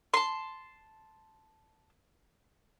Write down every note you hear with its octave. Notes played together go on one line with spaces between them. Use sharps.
A5 C6